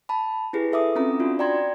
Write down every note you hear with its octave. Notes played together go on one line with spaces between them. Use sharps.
A5 B5
E4 G4 G#4 B4
A4 E5 D6 D#6
C4 C#4 F4 A#5 D#6
D4 F4 F#4
D5 G5 A#5 C6 G#6